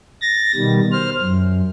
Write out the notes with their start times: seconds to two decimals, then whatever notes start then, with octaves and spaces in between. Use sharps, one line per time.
0.21 A6 A#6
0.56 B2 D#3 G3
0.92 C5 F6
1.21 F#2